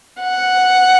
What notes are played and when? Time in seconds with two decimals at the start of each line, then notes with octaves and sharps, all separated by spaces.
0.20 F#5